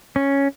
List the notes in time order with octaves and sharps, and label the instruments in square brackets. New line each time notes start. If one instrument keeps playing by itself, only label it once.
[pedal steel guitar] C#4